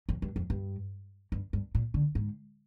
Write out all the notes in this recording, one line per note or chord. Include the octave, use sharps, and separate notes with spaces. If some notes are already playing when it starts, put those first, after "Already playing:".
F2
G2
F2
G2
G2
G2
A#2
D3
G#2